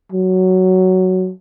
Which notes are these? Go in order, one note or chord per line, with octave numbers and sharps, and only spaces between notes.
F#3